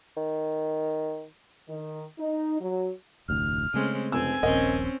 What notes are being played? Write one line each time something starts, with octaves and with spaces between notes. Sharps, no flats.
D#3
D#3
D#4
F#3
F1 D2 A2 F6
C#3 G#3 A3 C4 C#4
F1 C4 G#5 E6
D#1 A#1 C4 C#4 A#4 D#5